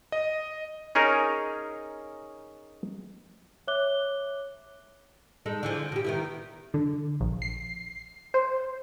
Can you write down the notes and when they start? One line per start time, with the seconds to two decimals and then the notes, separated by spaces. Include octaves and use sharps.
0.12 D#5
0.95 C#4 D#4 G#4 A#4 C#5
3.68 C#5 E5 D6 F#6 G7
5.46 G#3 D#4 A4
5.63 D3 E3 F3
5.92 B2 G4
6.04 D#3 B3 E4
6.74 D3
7.21 A#1
7.42 C7
8.34 C5